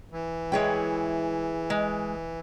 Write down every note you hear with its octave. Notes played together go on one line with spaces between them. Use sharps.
E3
G#3 E4 G#4 C#5 G5
G#3